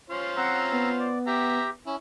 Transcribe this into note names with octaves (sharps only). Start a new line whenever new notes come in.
C#4 F4 C5
C4 F#5 A#5 E6
B3
D5
G4 E5 G5 A#5
C#4 E4